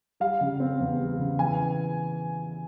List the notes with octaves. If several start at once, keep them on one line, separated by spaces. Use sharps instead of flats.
G3 F5
C#3
C4
E2
G3
C#3
E3 G#5